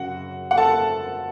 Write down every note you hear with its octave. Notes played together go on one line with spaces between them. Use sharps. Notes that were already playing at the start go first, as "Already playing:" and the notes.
Already playing: F#2 C#3 F#3 F#4 F#5
F#5
A4 A5